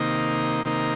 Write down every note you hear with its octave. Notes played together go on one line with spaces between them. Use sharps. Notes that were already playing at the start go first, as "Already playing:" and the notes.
Already playing: C3 D#3 A#3 D#4
C3 D#3 A#3 D#4